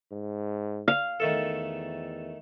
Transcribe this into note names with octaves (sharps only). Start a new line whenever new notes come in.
G#2
F5
E2 D#3 A3 A4